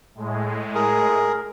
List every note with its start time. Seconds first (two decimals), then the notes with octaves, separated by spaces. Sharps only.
0.15 A2 G#3
0.75 G#4 A#4